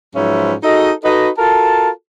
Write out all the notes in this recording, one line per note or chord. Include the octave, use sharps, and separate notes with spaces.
G#2 F3 F#3 C#4 B4 E5
D#4 F#4 G#4 A4 D#5
D#4 F#4 A4 B4 D#5
F4 F#4 A4 A#4 A5